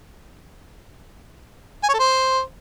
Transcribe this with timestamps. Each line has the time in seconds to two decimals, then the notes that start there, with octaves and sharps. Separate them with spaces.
1.83 G#5
1.89 C#5
1.94 A4
1.99 C5